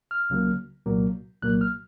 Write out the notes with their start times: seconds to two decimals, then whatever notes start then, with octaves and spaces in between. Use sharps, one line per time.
0.11 F6
0.30 C#2 C#3 F#3 A#3
0.86 C2 A#2 F#3 A#3
1.42 C2 A#2 F#3 A#3 F#6
1.61 F6